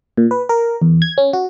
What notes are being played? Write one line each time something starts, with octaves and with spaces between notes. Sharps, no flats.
A#2
B4
A#4
E2
G#6
C#4
F#4